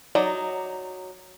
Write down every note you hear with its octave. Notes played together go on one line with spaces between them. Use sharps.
F#3 D#4 D5